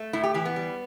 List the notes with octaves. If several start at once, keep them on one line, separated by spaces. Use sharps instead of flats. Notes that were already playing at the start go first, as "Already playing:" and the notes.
Already playing: A3
A2 E4
G4
E3 G4
B3
G3